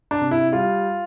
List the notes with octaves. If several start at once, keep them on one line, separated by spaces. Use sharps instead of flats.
D4
C3
E4
G3 F4